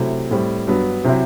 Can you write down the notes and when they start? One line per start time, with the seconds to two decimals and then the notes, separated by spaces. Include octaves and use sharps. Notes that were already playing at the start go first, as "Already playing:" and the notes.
Already playing: C3 F#3 A3 E4
0.31 A2 G3 C4
0.67 G2 F#3 B3
1.04 C3 F#3 C4 E4